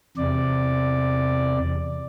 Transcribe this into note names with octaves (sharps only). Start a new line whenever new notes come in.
E2 C3 D5